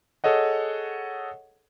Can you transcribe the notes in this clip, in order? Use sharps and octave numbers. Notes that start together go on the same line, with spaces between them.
G#4 A4 C#5 D#5 F#5